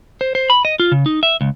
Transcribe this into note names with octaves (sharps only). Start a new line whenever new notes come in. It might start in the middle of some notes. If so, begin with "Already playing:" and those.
C5
C5
B5
D#5
F4
C#3
D#4
E5
C#2